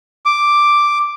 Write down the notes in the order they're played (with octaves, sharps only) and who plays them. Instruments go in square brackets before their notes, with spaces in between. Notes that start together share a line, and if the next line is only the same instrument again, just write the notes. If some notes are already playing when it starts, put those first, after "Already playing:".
[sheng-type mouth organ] D6